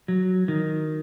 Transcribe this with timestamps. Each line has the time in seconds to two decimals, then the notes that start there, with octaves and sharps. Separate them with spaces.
0.08 F#3
0.48 D#3